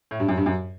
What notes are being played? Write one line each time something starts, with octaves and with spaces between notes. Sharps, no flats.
A2
G2
F#2
G2
F#2